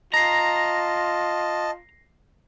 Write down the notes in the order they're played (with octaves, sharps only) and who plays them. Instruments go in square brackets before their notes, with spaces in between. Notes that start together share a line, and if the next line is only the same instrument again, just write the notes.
[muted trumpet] F4 [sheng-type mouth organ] D#5 A5 [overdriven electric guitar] A#5 [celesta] A#6 C7